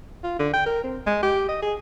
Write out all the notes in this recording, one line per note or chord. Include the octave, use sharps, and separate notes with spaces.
F4
D3
G5
A#4
C4
G#3
G4
D#5
G#4